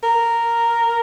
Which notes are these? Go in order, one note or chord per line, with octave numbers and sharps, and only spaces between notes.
A#4